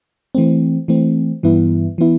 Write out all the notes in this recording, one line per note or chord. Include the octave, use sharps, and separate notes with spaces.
E3 A3 C4
E3 A3 C4
G2 E3 B3 E4
E3 B3 E4